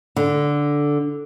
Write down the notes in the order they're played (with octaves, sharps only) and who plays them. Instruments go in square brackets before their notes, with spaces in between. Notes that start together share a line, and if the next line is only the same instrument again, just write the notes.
[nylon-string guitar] D3